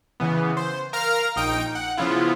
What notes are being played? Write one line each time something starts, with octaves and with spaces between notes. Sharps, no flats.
C#3 E3 B3
C5
A#4 F5 A#5 F6
A#1 D#4 G5 D7
F#5
C#3 F3 B3 E4 F4